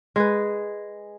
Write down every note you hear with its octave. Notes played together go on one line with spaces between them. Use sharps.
G#3 G#4 B4